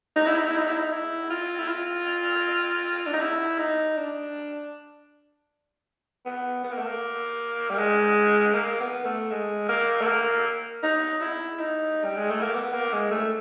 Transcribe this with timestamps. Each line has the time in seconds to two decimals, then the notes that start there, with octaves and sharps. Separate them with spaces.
0.16 D#4
0.26 E4
0.37 D#4
0.47 E4
0.57 D#4
0.67 E4
0.78 D#4
0.92 E4
1.30 F4
1.60 E4
1.68 F4
3.06 D4
3.13 D#4
3.20 E4
3.59 D#4
3.97 D4
6.26 B3
6.64 B3
6.71 A#3
6.78 A3
6.86 A#3
7.70 G3
7.78 G#3
8.54 A#3
8.80 B3
9.05 A3
9.31 G#3
9.69 A#3
10.01 A3
10.07 A#3
10.83 D#4
11.21 E4
11.59 D#4
12.04 G3
12.17 G#3
12.30 A3
12.42 A#3
12.54 B3
12.73 A#3
12.93 G#3
13.11 A3